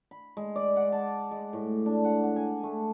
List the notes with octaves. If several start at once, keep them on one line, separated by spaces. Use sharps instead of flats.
B5
G#3
D5
F#5
A5
G#3
A2
D4
F#5
F#5
G#5
A3